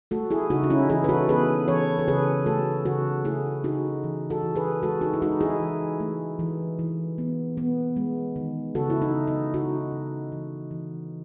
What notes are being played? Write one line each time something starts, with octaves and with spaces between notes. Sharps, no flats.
A3 F#4 A4
E4 G#4
C#3 D#4 F#4
D#4
C#4 E4
E3 E4 G#4
B4
F#4 A4
B3 G#4 B4
E3 A4 C#5
A4
C#3 G#4 B4
A3 F#4 A4
C#3 F#4 A4
A3 E4 G#4
C#3 D#4 F#4
E3
F#4 A4
E3
G#4 B4
G#3 F#4 A4
D#4 F#4
E4
G#3 D#4 F#4
E4 G#4
E3
A3
E3
E3
B3
B3
G#3
D#3
C#3 F#4 A4
E4
D#4
C#3
D#4
C#3 D#4 F#4
C#3
E3
E3